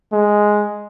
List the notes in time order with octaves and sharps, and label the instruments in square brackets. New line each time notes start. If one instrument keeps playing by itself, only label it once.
[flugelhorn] G#3